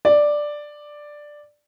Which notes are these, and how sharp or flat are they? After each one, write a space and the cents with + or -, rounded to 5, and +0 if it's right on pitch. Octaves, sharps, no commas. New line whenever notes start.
D5 +5